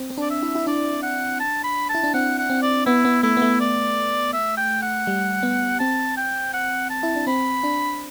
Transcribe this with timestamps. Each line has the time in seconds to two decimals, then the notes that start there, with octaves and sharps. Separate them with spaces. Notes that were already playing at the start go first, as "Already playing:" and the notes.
Already playing: C4
0.10 C4
0.18 D4 D5
0.30 E5
0.43 E4
0.55 E4
0.67 D4 D5
1.03 F#5
1.40 A5
1.64 B5
1.89 A5
1.95 E4
2.04 D4
2.14 C4 F#5
2.38 F#5
2.50 C4
2.62 D5
2.86 B3 E4
3.05 B3
3.23 A3 E4
3.37 B3
3.42 A3
3.60 D5
4.33 E5
4.57 G5
4.82 F#5
5.07 G3
5.43 B3
5.80 C4 A5
6.17 G5
6.53 F#5
6.90 A5
7.03 E4
7.16 D4
7.27 C4 B5
7.64 D4